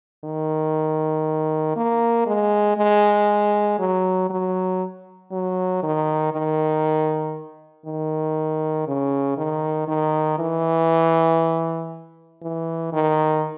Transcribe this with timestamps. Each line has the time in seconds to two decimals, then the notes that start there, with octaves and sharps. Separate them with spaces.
0.24 D#3
1.76 A#3
2.27 G#3
2.77 G#3
3.79 F#3
4.30 F#3
5.32 F#3
5.83 D#3
6.32 D#3
7.86 D#3
8.87 C#3
9.37 D#3
9.88 D#3
10.39 E3
12.42 E3
12.93 D#3